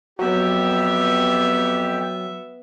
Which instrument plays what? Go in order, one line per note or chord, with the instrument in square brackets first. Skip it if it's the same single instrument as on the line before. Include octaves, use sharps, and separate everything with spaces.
[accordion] F2 G4 [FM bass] F#3 [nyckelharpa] B3 E5